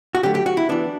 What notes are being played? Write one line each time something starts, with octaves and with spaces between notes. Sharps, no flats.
F#4
D3 F#3 A3 G4
G4
F#4
E4
E3 B3 D4